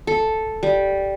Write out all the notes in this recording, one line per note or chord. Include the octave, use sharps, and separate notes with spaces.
A4
G3